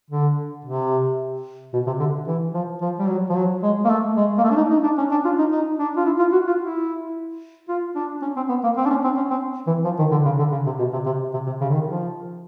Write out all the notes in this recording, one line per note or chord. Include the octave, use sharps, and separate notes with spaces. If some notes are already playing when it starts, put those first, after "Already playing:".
D3
C3
B2
C3
D3
E3
F3
F3
G3
F#3
F3
F#3
G#3
A#3
A3
G#3
A#3
A3
D4
D#4
D#4
D4
C#4
D4
F4
D#4
D#4
D4
F4
E4
F4
F#4
F4
E4
F4
D4
C#4
C4
B3
A#3
C4
D4
C#4
C4
C#4
C4
E3
F3
D#3
D3
C#3
D3
C#3
C3
B2
C3
C3
C3
C3
C#3
D3
D#3
F3